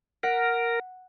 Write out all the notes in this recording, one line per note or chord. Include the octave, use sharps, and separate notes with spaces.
A#4 F#5 B6